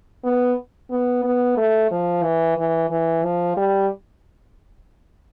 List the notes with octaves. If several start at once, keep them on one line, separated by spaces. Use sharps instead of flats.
B3
B3
B3
A3
F3
E3
E3
E3
F3
G3